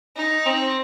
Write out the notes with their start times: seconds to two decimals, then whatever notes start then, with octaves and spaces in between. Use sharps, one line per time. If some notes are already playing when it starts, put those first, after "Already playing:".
0.16 D#4
0.46 C4